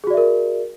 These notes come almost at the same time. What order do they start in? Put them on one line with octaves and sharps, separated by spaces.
G#4 F#4 D5 E5 A#4